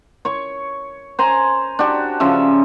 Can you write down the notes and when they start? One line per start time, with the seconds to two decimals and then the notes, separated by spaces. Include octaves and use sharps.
0.25 C#5 C#6
1.19 C5 G#5 A#5
1.79 D4 F#4 G4
2.20 C#3 F3 C#4 E5